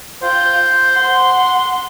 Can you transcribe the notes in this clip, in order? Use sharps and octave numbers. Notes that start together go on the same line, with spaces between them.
F4 C5 G5
F#5 C6